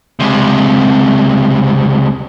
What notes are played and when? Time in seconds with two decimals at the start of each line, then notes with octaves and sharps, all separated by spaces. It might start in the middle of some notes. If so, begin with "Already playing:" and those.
0.20 C#2 C3